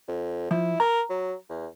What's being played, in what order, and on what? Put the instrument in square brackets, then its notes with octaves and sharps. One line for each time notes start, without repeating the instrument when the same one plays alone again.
[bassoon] F2
[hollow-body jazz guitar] F3 [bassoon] E4
[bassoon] A#4 [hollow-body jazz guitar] A#5
[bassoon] F#3
E2